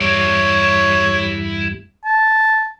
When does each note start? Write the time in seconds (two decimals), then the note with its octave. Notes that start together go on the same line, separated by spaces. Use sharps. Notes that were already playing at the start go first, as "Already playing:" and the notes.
0.01 E2 G2 G3 E4 C#5 D5
2.05 A5